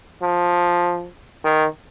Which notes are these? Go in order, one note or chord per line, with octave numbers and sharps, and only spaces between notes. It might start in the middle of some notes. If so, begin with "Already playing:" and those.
F3
D#3